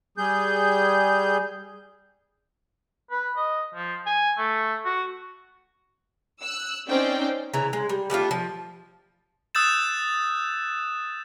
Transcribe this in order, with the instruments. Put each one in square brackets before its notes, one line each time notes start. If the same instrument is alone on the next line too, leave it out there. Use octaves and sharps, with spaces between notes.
[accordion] G3 G#4 G6
[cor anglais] B4
D#5
F3
G#5
A3
F#4
[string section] E6 F#6
C4 C#4 D#4 C5 D5 G5
[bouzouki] C#3 E3 A#5
G#3
G3
G3 A3 D4 F4
F3
[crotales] D#6 E6 F#6 G6 A6 E7